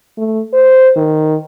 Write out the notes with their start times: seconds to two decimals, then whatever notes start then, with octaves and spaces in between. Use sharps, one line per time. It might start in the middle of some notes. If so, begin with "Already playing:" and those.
0.18 A3
0.53 C5
0.96 D#3